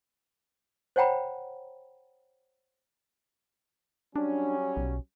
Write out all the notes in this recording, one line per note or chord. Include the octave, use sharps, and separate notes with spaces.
C5 C#5 F#5 G5 A#5 B5
F#3 G3 C#4 D4
B1